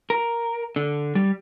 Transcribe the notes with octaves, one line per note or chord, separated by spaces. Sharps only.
A#4
D3
G3